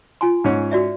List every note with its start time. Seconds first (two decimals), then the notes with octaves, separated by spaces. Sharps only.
0.21 F4 G#5 C6
0.44 G#2 C#4
0.71 F#4 D5 E5